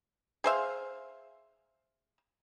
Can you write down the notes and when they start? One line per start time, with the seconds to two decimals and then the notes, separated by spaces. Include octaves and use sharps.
0.44 G#4 C5 E5 F5